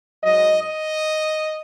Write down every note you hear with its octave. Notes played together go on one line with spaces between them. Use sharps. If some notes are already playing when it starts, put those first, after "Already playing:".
G#2 F#3 D#5
D#5